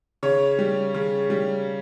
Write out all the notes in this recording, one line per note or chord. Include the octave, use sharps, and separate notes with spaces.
C#3 C#5
G3
C#3
G3